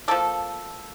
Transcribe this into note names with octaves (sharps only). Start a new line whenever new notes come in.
F3 A#3 A4